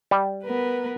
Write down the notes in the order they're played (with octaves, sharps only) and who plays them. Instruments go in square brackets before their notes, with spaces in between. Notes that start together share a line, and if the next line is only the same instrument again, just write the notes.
[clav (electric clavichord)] G3
[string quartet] B3 A#4 B4